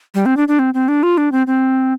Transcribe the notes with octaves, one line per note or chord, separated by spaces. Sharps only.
G3
C4
D4
D4
C4
C4
D4
F4
D4
C4
C4